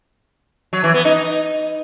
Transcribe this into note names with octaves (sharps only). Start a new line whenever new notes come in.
F#3
E3
B3
D#4